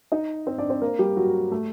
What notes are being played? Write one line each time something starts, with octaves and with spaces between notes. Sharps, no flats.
D#4 D#5
C4 C5
D4 D5
C4 C5
A#3 A#4
G3 G4
F#3 F#4
A3